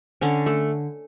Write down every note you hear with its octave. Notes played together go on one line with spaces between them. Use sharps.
D3 C#4
A3